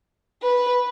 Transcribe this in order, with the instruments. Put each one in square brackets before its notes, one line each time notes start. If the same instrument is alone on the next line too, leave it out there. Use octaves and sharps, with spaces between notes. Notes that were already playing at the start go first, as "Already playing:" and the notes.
[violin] B4